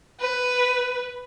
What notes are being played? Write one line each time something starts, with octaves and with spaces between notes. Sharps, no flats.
B4